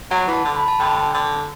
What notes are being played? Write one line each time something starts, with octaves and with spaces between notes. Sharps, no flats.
F#3 F#5
E3
A5
D3
B5
A5
D3 G5
D3